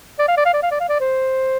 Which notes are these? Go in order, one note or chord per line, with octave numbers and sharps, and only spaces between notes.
D5
F5
D5
F5
D5
F5
D5
F5
D5
C5